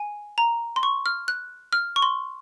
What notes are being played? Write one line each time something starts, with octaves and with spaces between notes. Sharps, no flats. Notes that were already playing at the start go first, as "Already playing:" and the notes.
Already playing: G#5
A#5
C6
C#6
F6
F#6
F6
C#6
C6